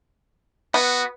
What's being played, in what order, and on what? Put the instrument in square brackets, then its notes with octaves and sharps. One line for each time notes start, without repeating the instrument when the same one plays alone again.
[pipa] B3 [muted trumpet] F#4